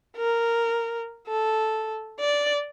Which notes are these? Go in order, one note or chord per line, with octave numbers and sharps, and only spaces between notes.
A#4
A4
D5